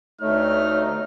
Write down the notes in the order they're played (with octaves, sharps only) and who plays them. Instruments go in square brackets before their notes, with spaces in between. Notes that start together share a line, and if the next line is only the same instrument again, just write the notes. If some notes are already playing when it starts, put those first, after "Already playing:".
[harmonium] D2 A3 [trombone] D#4 [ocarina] C#5 [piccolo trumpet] F6